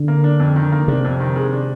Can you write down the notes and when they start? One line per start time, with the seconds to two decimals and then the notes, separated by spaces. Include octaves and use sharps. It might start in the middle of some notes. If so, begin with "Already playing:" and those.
Already playing: D3
0.08 A#3
0.24 D4
0.40 F2
0.56 D#3
0.72 A#3
0.88 C3 D4
1.05 F2
1.20 D#3
1.36 G#3
1.53 D4